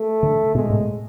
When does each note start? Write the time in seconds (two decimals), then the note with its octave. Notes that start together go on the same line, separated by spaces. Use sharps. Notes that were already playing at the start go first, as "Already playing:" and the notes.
Already playing: A3
0.23 D3
0.55 B2 G#3
0.70 A2